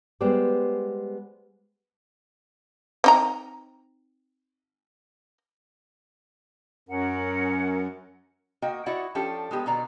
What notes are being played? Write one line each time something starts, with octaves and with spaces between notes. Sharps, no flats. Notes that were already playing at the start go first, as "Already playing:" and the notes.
G3 G#3 B3 G4 C5 D5
C4 D#4 A#5
F#2 C#4 A#4 F#5
A#3 F#4 D#5 G5
E4 F#4 D5 D#5 F#5
F3 C#4 D4 G4 A4
G#3 B3 G4
B2 D3 D#3 D5 A#5